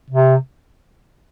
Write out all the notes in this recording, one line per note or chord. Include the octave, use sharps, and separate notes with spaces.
C3